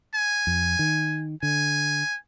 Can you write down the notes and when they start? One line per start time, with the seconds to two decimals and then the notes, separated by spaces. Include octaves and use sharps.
0.15 G#5
0.47 F2
0.79 D#3
1.43 D3 G#5